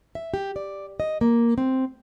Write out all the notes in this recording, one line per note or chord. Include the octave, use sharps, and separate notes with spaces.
E5
G4
D5
D#5
A#3
C4